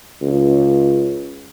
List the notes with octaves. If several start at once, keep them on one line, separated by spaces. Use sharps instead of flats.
C#2